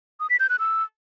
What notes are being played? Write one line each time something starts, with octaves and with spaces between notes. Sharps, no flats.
D#6
B6
G6
F#6
E6